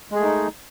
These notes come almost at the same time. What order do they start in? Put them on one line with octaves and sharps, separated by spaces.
G#3 G#4 A3 D#4